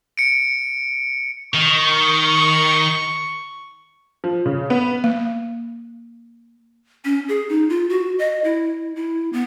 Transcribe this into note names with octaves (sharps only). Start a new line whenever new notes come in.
C#7 D7
D#3 C#6
F3
C#3
B3
A#3
C#4
G#4
D#4
F4
F#4
D#5
E4
E4
B3